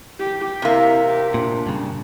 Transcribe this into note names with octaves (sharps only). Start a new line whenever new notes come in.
G4
C3 A#3 E4 E5
G4
A#2 D4
G2 C#3